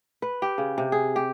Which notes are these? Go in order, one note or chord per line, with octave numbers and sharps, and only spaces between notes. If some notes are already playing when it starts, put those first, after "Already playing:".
B4
G4
C#3
C3
G#4
G4